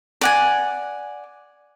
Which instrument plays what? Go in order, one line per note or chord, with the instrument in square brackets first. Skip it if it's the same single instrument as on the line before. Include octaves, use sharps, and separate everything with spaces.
[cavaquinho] D5 F#5 G#5